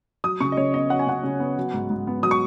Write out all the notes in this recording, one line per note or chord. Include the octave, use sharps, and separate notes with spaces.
F#3 D#6
C#3 C#6
D#5
C#3 C#5
B3 D#5
F#3 F#5
G#5
C#3 F#5
C#3
B3
F#3
G#2
G#2
B3
F#3 D#6
C#6